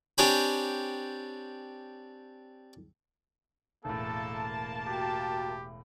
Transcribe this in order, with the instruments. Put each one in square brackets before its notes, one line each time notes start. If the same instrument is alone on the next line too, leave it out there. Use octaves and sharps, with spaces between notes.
[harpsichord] C4 D4 G4 C#5 G#5 B5
[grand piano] E1 A2 [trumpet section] A#3 A5 [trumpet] A4
[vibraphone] F#4 G5 [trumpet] G4